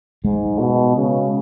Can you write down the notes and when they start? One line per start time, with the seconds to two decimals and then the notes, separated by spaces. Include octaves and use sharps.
0.24 G#2 G#3
0.60 B2
0.96 C#3